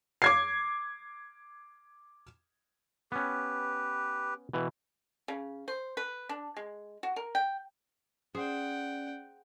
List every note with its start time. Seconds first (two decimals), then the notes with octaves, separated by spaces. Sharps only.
0.22 D6 G#6 C7
3.12 B3 C#4 G4 B4
4.53 B2 E3
5.28 C#3
5.68 C5
5.97 B4
6.29 D4
6.56 G#3
7.03 F#4
7.16 A#4
7.35 G5
8.35 C#4 G#4 C5 D5 F#5 G5